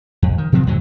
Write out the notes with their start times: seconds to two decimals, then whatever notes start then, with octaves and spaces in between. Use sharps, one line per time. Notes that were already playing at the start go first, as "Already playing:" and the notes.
0.22 F2
0.38 D#3
0.52 B2 F3 F#3 C4
0.67 F2 A2 D3 F#3